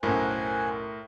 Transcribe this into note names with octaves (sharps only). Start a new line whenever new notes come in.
B1 F#2 A2 A#4 C5 F#5 G#5